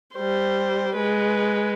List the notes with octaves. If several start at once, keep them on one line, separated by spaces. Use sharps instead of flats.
G3 C5
G#3 B4